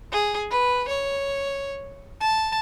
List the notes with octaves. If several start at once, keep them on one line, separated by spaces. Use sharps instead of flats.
G#4
B4
C#5
A5